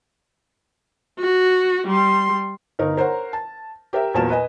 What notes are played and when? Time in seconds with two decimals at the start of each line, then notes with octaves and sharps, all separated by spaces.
1.19 F#4
1.87 G3 C6
2.79 G1 D#4 A#4
2.97 A#4 C5 C#5 F#5 A#5
3.33 A5
3.93 G4 A#4 E5
4.14 E2 A#2 F#3 A#4 A5 E7
4.30 B4 D#5 G#5